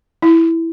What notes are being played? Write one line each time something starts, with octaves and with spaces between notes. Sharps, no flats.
E4